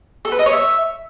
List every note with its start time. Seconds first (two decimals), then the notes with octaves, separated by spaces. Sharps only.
0.25 A4
0.32 B4
0.39 D#5
0.46 C#5
0.53 E5